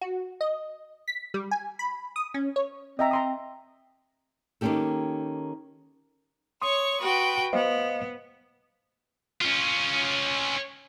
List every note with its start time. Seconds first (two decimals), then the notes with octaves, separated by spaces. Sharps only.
0.01 F#4
0.41 D#5
1.08 B6
1.34 G3
1.51 G#5
1.79 B5
2.16 D#6
2.34 C#4
2.56 C#5
2.99 C4 D#5 E5 A#5
3.11 A#5 C6 D#6
4.61 D#3 A#3 C4 C#4 G4 A4
6.62 C#5 C6 C#6 D#6
7.00 F#4 B4 G5
7.53 B3 C5 D#5 F5
9.41 C#4 F4